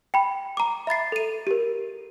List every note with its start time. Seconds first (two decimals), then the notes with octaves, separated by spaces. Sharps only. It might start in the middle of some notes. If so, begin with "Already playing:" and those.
0.14 G5 B5
0.57 A#5 D6
0.87 E5 B5 A6 C7
1.12 A4 D#7
1.47 G4 A#4